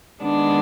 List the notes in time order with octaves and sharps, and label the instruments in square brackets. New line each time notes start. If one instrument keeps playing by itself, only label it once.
[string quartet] D#3 G#3 B3 D4